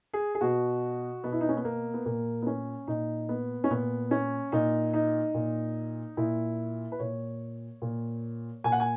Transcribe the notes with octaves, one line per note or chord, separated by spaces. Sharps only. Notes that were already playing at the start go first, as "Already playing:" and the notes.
G#4
G#4
B2 F#4
B2 B3
E4
D#4
C#4
B3
A#3
B3
A#2 A#3
B3
C#4
A#2 D#4
B3
C#4
A#2 B3
C#4
A#2 D#4
D#4
A#2
A#2 E4
B4
A#2 C#5
A#2
A#2 G#5
F#5
G#5